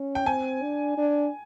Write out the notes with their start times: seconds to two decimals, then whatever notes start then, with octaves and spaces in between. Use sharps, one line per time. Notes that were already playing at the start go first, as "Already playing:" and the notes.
Already playing: C#4
0.15 G5
0.26 C4 G#5
0.62 D4
0.98 D4